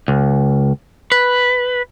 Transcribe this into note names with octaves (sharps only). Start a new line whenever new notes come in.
C#2
B4